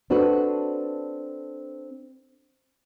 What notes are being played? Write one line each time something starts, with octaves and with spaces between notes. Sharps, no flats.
C4 D4 F#4 A4 B4